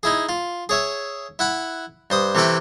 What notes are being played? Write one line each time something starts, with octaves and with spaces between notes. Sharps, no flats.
D#4 E4 G#4
F4
G#4 C#5 E5
E4 F#5 B5
G2 C5 D#6
C3 E3 A3 A4 G5 B5